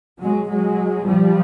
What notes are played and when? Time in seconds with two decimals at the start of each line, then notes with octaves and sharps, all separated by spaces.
0.21 F#3 G#3
0.50 F#3 G#3
1.07 F3 G3